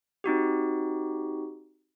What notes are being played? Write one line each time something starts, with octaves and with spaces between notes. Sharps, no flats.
C4 D#4 F#4 G4